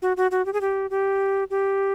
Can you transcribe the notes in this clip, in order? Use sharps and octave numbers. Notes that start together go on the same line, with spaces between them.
F#4
F#4
F#4
G4
G#4
G4
G4
G4